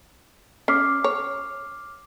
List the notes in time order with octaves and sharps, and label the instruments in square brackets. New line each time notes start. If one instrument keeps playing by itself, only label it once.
[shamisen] C#4 [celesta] D6 F6 C7
[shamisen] C#5